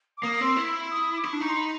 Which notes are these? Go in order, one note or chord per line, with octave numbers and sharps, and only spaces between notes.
D6
A#3 D#6
C4 E6
E4
D#6
D6
E4 C#6
D4
D#4 C#6
C6
B5